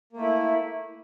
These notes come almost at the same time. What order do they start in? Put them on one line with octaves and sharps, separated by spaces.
A#3 A3 E4